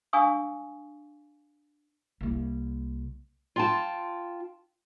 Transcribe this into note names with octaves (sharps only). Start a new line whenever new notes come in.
D4 F5 G#5 C#6 D#6 E6
C2 A#3
F4 G5 A5